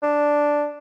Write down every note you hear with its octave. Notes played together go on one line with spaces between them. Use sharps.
D4